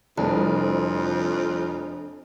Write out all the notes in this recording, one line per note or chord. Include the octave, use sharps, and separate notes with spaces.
F1 C2 F2 D4